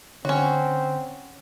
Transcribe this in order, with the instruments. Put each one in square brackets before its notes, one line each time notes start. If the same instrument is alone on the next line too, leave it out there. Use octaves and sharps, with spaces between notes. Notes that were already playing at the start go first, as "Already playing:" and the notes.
[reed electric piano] D3 C#5 [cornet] C4 [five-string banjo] C#4 F#4